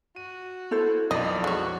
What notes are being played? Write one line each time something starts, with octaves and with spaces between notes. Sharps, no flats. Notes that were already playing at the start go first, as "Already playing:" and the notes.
F#4 D#7
E4 A4 C5
B1 F2 D5 D#5
G#3 F#4 C#5